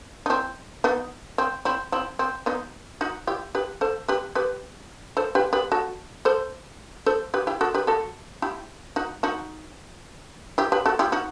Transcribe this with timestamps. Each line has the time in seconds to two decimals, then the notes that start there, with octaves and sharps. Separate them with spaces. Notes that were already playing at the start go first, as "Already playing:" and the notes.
0.26 D#4
0.30 C4 E4
0.84 B3 D#4
1.38 C4
1.65 C4 E4
1.92 C4 E4
2.19 C4
2.46 B3 D#4
3.01 D#4 F#4
3.27 E4 G4
3.55 G4 B4
3.81 A4 C5
4.08 G4 B4
4.35 G4 B4
5.17 A4 C5
5.35 G4 B4
5.53 G4 B4
5.72 F#4 A4
6.25 A4 C5
7.06 A4 C5
7.34 G4 B4
7.47 E4 G4
7.61 F#4 A4
7.74 G4 B4
7.87 F#4 A4
8.42 E4 G4
8.96 D#4 F#4
9.23 D#4 F#4
10.58 E4 G4
10.72 G4 B4
10.86 F#4 A4
10.99 E4 G4
11.12 D#4 F#4